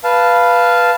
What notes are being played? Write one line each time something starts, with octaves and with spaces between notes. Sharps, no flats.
B4 F5 A5